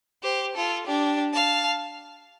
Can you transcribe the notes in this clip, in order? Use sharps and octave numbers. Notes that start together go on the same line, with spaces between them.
G4 C5
F4 A4
D4 G4
F5 A5